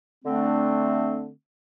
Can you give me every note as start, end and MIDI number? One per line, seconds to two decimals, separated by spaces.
0.25 1.29 50
0.25 1.29 57
0.25 1.29 60
0.25 1.29 62